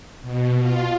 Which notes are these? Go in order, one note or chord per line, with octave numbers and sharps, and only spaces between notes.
B2
F4